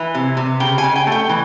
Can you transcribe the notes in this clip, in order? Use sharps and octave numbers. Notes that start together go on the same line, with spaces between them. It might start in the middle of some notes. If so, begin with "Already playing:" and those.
Already playing: E3
C3
C3
C#3 G5
G#5
C#3
G5
A3
G5
E3